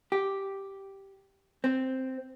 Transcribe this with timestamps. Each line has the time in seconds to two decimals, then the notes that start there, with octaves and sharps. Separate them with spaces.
0.12 G4
1.64 C4